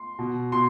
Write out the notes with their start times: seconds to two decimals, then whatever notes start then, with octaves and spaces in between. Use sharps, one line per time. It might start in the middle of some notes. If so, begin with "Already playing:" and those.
Already playing: C6
0.19 B2
0.52 B2 C6